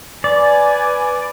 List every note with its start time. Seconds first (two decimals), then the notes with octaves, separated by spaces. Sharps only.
0.24 B4 D5 G#5